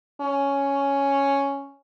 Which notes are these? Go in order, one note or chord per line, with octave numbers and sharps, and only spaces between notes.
C#4